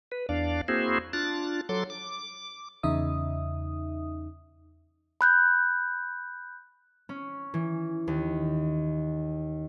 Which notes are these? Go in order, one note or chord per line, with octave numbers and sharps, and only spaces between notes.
B4
E2 D4 D5 F5
A#3 C4 E4 F#4 G#4 C5
D4 F4 F#6 A6
F#3 A4 C6 D6
D6
E2 C#3 D#4 E5 D#6
B5 F#6 G6
C#4
E3
D#2